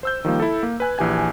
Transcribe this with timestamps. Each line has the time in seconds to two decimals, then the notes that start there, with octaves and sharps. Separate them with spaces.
0.03 C5 E6 G6
0.25 D#3 F3 G3 A#3
0.40 E4 A4
0.63 A#3
0.80 B4 G#5 F#6
0.98 A#1 E3 G4 G#5 G#6